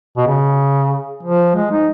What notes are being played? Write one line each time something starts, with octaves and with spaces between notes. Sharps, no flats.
B2
C#3
F3
G#3
D#4